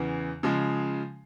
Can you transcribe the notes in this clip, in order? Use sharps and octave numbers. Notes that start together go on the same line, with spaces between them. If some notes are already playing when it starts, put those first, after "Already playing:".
Already playing: E2 C#3 E3
C#3 F3 G#3